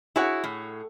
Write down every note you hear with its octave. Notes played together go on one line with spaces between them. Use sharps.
E4 F#4 G#4 C#5 F#5
A2